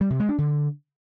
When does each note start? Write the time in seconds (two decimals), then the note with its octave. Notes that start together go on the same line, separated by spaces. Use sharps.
0.01 G3
0.10 C3
0.20 G#3
0.29 D4
0.38 D3